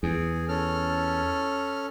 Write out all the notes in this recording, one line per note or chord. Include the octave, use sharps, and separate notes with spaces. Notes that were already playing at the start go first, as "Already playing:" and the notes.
E2 G#4
C#4 A4 F6